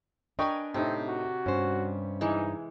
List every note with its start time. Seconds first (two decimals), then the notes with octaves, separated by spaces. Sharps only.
0.39 D4 A#4 B4 D#5 G5 G#5 C#6
0.74 A2 C3 C4 D#4
1.08 F#4
1.46 G2 C#4 C5
2.21 E3 G#3 D#4